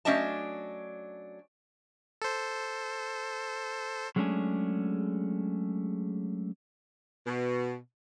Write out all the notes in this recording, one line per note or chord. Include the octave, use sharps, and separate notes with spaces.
F#3 A3 C#4 D4 D#5 A5
A4 C5
F#3 G#3 A3 C#4 D4 G#4
B2